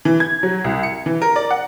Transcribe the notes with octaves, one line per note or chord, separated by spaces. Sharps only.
E3
G#6
F#3
C2
C#7
E3
A#4
D5
F#5